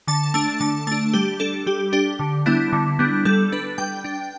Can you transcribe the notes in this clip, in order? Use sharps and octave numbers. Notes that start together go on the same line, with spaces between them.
D3 A5
A3 D4 A5
D3 A5
A3 D4 A5
G3 G4
D4 A4
G3 G4
D4 G4
D3
G3 B3 D4 E4
D3
G3 B3 D4
G3 A4
D4 B4
G3 G5
D4